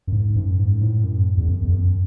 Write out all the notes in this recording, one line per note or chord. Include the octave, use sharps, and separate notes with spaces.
F#2
G#2
F#2
G#2
A2
F#2
E2
F#2
E2
F#2